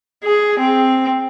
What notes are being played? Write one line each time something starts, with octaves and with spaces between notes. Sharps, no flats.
G#4
C4